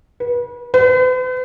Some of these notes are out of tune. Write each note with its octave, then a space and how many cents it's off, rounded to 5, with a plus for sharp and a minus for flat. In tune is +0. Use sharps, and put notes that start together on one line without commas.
B4 -35
B4 +45